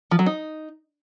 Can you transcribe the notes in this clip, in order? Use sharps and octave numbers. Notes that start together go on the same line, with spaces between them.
F3
F#3
D#4